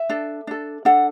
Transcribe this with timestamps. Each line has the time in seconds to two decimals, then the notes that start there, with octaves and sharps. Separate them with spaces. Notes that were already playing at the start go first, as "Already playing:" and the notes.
Already playing: E5
0.09 D4 A4
0.47 D4 A4
0.85 D4 A4 F#5